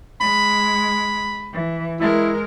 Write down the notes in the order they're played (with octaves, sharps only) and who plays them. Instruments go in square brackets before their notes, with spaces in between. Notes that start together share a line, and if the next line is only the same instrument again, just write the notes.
[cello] G#3 [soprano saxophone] B5
[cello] E3
[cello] G#3 A#4 [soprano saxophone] E4